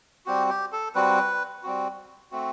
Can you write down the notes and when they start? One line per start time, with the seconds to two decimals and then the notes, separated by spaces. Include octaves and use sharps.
0.26 G3 C4 F#4 G4
0.50 G4
0.73 A4
0.95 G3 C4 F#4 B4
1.64 G3 C4 F#4
2.32 A3 C4 F#4